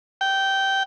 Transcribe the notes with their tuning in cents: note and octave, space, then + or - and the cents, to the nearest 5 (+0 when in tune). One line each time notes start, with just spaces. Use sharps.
G5 -15